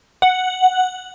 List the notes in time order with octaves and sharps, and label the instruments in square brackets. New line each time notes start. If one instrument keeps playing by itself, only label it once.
[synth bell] F#5